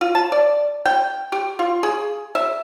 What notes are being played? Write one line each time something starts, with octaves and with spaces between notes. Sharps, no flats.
F4
A5
D5
G5
G4
F4
G#4
E5